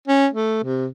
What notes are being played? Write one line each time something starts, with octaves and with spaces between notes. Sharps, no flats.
C#4
A3
C3